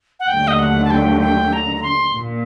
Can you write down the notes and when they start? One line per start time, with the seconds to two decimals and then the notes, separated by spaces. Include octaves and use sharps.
0.20 F#5
0.28 D#2 D3 F#3 A3 G5
0.47 D#5
0.59 F#5
0.84 A5
0.91 G5
1.21 G5
1.53 A#5
1.77 A#5
1.82 C6
2.14 A#2